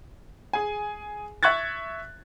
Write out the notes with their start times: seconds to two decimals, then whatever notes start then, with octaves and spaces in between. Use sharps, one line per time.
0.53 G#4 G#5
1.43 E5 C#6 F#6 G#6 A6